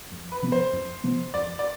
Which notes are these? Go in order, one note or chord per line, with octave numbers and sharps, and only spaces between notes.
F2
B4
C3 F3 B3
C5
F2
C3 F3 B3
F2 D5
D5